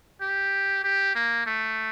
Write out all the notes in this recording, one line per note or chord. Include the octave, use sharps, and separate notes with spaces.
G4
G4
A#3
A3